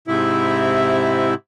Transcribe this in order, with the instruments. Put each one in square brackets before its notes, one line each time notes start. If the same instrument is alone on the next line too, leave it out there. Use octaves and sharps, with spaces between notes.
[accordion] G#2 C3 E4